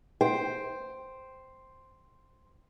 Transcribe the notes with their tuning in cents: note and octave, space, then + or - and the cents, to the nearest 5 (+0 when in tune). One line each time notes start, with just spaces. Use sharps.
C5 +0 G5 +0